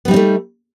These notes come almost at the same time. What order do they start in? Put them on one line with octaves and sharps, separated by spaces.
B3 G3 D#4 C4 A3